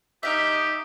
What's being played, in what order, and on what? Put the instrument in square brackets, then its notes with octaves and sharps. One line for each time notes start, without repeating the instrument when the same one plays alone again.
[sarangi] D#4 [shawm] G4 [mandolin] E5 F5